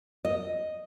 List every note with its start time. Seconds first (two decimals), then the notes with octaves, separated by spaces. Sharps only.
0.25 D#5